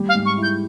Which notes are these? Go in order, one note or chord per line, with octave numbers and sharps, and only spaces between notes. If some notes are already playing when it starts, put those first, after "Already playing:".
Already playing: G3
F5
G#2
C#6
E4
G6